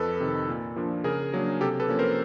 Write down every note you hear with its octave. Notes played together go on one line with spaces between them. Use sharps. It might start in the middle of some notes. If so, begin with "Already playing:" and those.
Already playing: F2 A4 B4
C3 D#3
A#2
F3 A#3 D4
C#3 G#4 A#4
F#3 A#3 D4
C3 G4 A4
A4 B4
F3 A#3 C#4
A#4 C5